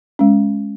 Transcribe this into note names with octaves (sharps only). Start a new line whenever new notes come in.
G#3 C#4